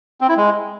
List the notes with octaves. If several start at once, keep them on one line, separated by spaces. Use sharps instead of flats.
C4
E4
G#3